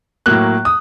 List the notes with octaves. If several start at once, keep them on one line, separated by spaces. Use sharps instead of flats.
A2 F#3 A#3 F#6
D#6